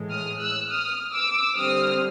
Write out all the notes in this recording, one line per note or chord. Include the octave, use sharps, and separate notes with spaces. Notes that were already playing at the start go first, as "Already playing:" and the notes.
Already playing: A2 E3 G#3
D#6 F6
E6 F#6
D#6 F6
D6 E6
D3 G3 C4 D#6 F6